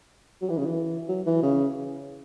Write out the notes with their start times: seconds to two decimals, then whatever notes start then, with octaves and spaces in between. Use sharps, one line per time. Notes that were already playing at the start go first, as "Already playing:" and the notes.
0.42 F#3
0.50 E3
0.58 C#3
0.65 E3
1.09 F#3
1.26 E3
1.43 C#3